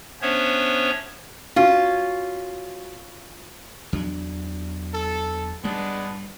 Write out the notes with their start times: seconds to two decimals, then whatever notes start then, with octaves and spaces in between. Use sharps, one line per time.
0.22 B3 C#4 D4 C5 C#5 E5
1.56 C#4 F4 F#4
3.93 E2 F#3 D4
4.94 A4
5.64 G2 G3 G#3 B3 D4